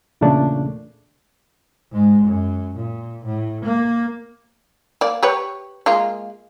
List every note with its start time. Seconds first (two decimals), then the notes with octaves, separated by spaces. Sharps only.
0.21 E2 A#2 C#3 A3 D4
1.92 G#2 G#3
2.26 F#2
2.76 A#2
3.26 A2
3.66 A#3
5.01 A#3 D5
5.23 G4 B4 C#5
5.86 G#3 A#3 F4